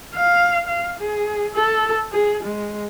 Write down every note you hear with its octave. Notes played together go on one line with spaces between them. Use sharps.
F5
F5
G#4
A4
G#4
G#3